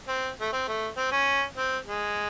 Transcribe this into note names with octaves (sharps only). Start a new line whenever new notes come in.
C4
A3
C4
A3
C4
C#4
C4
G#3